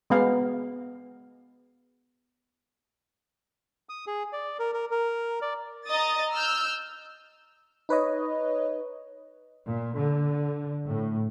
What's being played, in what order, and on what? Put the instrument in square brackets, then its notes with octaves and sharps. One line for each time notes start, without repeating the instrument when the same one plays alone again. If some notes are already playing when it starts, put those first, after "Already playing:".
[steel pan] G#3 B3 F5
[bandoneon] D#6
G#4
D5
A#4
A#4
A#4
D5
[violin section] D#5 A#5 D#6 A6
E6 F6 G6
[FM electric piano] D#4 B4 C#5 D#5
[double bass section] A#2
D3
A2